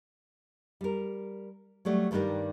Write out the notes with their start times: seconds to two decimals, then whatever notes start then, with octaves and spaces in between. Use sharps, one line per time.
0.81 G3 A#4
1.85 F#3 G3 A3 D5
2.11 G2 D#3 G3 D4 A#4 D5